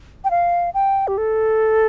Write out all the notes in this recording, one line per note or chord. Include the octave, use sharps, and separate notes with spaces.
G5
F5
G5
G4
A4